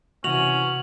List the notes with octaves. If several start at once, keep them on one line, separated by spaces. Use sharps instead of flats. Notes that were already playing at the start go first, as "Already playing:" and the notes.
C3 E3 C#4 F#4 F7 F#7